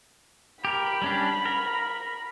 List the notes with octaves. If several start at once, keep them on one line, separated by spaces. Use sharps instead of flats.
G4 A#4 B5
G3 C#4 D4
A#4